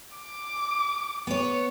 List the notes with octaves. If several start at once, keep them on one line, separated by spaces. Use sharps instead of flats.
D6
B3 C#5